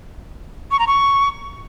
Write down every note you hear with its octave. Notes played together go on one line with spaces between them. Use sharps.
C#6
A#5
C#6